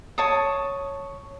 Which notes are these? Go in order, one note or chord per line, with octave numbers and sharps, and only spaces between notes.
C#5 A5 D#6